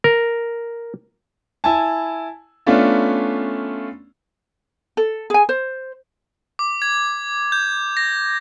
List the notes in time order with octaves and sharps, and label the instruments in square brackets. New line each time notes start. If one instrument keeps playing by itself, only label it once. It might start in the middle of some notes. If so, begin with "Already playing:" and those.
[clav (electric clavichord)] A#4
[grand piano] E4 G#5 A5
A3 B3 C#4 D4 F4
[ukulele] A4
G#4 G#5
C5
[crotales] D6
G#6
G6
A#6